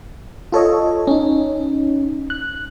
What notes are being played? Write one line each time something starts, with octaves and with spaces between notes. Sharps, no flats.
F4 A4 C#5 D#5
C#4 D#4
F#6